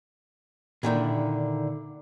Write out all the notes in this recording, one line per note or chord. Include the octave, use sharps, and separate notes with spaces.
A#2 D3 D#3 E4